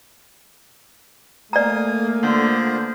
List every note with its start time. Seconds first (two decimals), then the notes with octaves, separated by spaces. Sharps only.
1.53 A3 A#3 D5 F5 G#5 A#5 D#6
2.23 D3 B3 F4 C5